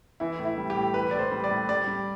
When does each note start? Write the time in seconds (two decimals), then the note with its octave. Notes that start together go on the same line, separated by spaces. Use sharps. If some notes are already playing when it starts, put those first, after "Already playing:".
0.20 E3 E4
0.39 A2
0.45 E4
0.57 G3
0.70 G4
0.76 A2
0.94 E3 B4
1.11 A2 D5
1.19 C5
1.31 G3
1.44 D5
1.51 A2
1.69 G3 D5
1.87 G3